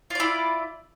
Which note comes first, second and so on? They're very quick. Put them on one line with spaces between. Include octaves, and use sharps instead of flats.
F4 D5 E4